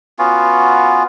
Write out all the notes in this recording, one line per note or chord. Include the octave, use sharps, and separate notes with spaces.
B3 C#4 F4 F#4